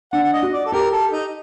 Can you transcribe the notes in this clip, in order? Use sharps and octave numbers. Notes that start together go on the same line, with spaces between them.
D4 F#5
F#5
D#5
F#4
D5
A4
G4 A#4
A4
D#4